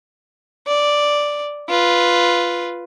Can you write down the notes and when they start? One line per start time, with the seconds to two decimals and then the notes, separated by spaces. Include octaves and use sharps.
0.67 D5
1.69 F4 B4